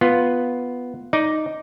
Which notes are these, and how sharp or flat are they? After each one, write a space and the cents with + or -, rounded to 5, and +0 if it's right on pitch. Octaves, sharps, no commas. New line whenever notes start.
B3 +0 F4 +0
D#4 +0 D5 +0